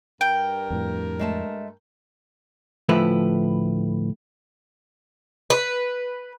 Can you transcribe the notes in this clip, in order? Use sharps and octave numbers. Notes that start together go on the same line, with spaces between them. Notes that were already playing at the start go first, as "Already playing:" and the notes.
G2 A#4 G5
F2 A2
G#3 A3 A5
D2 A2 F3 E4 B4
B4